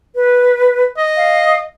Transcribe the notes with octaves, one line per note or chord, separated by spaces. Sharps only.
B4
D#5
F5